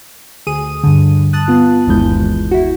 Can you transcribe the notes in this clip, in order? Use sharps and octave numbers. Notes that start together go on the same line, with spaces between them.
D2 G#4 D#6 D#7
G2 D3
A5 D#6 F#6
B3 F4
G1 D#2 E3 G#3 G6
E4 F#4